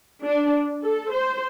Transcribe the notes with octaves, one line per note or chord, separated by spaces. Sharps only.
D4
A4
C5